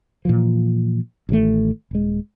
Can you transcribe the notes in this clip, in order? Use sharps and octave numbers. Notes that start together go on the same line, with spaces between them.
A#2 E3 F3
A1 D#3 G3 A3
D#1 G#3